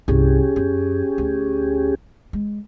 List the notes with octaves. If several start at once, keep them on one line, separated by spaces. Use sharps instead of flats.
C2 G2 C#4 G4 G#4
F#2
D2
G#3